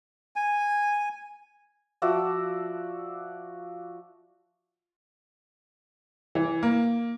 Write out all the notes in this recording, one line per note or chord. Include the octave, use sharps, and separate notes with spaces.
G#5
F3 F#4 D5 E5
E3
A#3